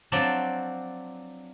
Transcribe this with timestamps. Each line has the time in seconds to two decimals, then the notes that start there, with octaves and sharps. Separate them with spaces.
0.12 F3 F#3 C4 D4 D5 A5